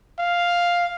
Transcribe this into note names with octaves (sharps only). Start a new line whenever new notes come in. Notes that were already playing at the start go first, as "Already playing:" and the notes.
F5